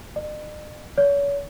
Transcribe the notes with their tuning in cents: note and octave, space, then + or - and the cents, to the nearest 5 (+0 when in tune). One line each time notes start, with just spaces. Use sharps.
D#5 -45
C#5 +35